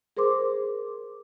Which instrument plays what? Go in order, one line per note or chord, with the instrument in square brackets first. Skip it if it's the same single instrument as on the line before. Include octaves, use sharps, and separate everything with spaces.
[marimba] G#4 A#4 C5 C6 D6